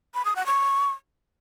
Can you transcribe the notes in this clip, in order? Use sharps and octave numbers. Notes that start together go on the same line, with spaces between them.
B5
D#6
F#5
C#6